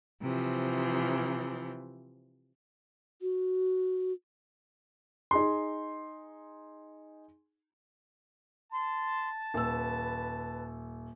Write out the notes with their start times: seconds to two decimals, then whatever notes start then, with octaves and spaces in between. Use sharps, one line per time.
0.22 C3 E3 F3
3.22 F#4
5.31 D#4 G#4 C6
8.73 A5 C6
9.54 D#1 B4 E6